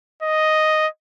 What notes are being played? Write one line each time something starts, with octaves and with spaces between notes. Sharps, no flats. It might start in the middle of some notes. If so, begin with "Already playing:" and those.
D#5